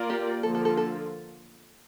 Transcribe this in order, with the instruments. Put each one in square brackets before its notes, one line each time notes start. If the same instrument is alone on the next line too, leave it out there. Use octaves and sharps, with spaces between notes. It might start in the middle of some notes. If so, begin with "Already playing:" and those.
Already playing: [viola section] A#3 F4 A#4 D5
[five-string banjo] G4
[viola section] D3 F3 A#3 F4 [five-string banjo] A4
[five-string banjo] A4
A4
A4